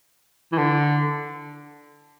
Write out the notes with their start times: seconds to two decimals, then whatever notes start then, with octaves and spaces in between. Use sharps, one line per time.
0.52 E3
0.58 D3